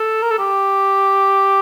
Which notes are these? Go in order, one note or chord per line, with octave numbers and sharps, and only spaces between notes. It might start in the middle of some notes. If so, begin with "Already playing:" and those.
Already playing: A4
A#4
A4
G4